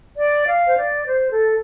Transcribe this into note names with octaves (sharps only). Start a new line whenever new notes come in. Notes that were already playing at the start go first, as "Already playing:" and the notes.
D5
F5
C5
D5
C5
A4